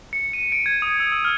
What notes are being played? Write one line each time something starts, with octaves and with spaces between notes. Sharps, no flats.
C#7
D#7
D7
G#6
D#6
E6
E6
F6